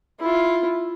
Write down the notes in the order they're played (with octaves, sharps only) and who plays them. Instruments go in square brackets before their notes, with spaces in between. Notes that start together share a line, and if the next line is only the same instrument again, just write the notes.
[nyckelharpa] E4 F4